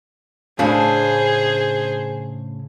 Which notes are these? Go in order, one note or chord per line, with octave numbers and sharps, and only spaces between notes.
A2 C#3 D4 G#4 C5